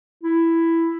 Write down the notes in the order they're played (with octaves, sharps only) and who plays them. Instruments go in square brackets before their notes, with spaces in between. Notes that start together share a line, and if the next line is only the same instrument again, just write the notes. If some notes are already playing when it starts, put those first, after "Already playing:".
[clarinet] E4